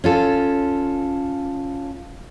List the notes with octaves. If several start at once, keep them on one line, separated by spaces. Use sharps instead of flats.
C#4 F4 A4